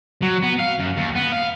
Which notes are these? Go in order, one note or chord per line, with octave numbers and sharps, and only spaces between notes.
F#3
B3
F5
F#2
D#2
B3
F5